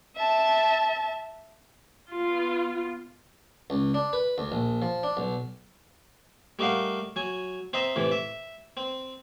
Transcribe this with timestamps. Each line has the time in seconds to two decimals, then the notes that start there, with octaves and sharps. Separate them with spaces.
0.16 E5 A5
2.11 B3 F4
3.70 C#2
3.94 D4
4.13 B4
4.38 D2
4.52 A#1
4.82 F3
5.03 D4
5.17 B1
6.59 G3 A3 D#4 A#4 F5 F#5
7.16 F#3 G#5
7.73 C4 C5 D#5 E5 A#5
7.96 A2 C3 E3
8.11 E5
8.77 C4